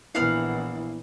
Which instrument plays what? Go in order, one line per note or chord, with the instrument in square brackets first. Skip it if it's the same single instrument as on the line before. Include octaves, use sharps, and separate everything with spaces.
[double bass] A#1 E3 [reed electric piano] B3 E4 [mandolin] F5 F#5 F6